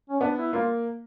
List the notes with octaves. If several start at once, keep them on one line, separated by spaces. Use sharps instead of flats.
C#4
B3 D4
E4
A#3 F4